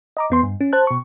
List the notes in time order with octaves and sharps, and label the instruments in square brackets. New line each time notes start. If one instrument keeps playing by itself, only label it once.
[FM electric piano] D#5 A#5 D6
E2 B3 C6
G2
C#4
C5 A5 F#6
B2 C#6